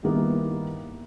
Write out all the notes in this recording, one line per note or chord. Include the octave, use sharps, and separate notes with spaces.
G2 D#3 A#3 B3 E4